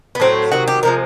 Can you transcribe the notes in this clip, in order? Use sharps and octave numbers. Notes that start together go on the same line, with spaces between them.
B3
A2 F#3 A3 C4
C3 D#3 F#3 F#4
G4
C3 F3 G#3 A#4